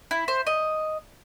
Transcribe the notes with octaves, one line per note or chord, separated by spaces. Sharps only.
E4
C5
D#5